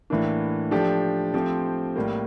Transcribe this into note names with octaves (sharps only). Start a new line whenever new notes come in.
A2 E3 A#3 D4
F3 A3 D4 G4
F3 A3 C4 G4
A2 G3 A#3